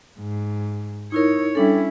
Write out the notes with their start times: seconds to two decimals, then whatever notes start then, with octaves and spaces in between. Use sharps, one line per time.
0.19 G#2
1.12 D#4 E4 A#4 C#5
1.55 G3 C#4 D4 E4 A4